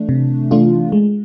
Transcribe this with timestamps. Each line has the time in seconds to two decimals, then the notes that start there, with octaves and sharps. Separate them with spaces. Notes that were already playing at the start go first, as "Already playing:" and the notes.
Already playing: E3 A3 D4
0.09 C3
0.51 E3 A3 D4 F4
0.92 G#3